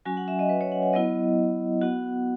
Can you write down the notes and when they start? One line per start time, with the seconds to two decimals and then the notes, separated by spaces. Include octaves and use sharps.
0.05 F#3 C#4 F#4 G#5
0.17 F#5
0.28 E5
0.39 D#5
0.49 B4
0.61 C#5
0.72 F#5
0.83 F#5
0.93 F#3 B3 E4 D#5
1.82 B3 F#4 F#5